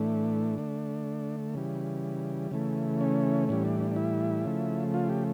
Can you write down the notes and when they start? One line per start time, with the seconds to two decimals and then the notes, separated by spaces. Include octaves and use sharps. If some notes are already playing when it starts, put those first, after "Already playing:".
Already playing: A2 E3 A3 D4
0.58 D3 A3
1.54 C#3 E3 G3
2.51 C#3 E3 A3
3.01 C#4
3.49 A2 E3 G3 C#4
3.65 D4
3.80 D4
3.91 D4
3.96 E4
4.45 C#3 F3 A3
4.94 F4
5.09 G4